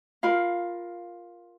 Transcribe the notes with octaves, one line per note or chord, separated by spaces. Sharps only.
F4 A#4 F5 B5